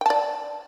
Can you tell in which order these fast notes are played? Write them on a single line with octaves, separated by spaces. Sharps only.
G5 A5 D5